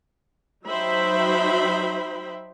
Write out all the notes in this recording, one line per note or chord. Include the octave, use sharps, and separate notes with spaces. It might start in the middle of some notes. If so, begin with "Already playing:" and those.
F#3 D#4 C5 E5 G5 B5